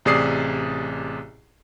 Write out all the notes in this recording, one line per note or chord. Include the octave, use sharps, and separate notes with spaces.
A1 C3 G#4 D5 D#6 C7